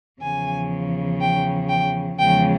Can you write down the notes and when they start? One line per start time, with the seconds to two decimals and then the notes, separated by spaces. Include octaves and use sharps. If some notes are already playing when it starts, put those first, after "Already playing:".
0.21 E2 C#3 F3 G#5
1.21 G5
1.69 G5
2.19 E2 C#3 F3 G#3 G5